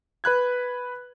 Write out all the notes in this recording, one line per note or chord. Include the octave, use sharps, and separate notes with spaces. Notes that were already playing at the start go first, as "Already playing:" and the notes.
B4 B5 F#6 G#6